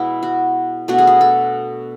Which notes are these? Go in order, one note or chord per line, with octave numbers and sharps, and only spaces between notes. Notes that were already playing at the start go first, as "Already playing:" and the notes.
Already playing: B2 G#3 B3 E4
F#4
B2 A3 D4 F#4
G#4
F#4
A4